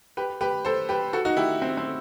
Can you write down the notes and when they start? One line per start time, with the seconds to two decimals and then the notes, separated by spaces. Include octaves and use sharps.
0.17 G4 B4
0.41 G4 B4
0.65 A4 C5
0.89 G4 B4
1.13 F#4 A4
1.25 D#4 F#4
1.37 E4 G4
1.62 C4
1.77 C4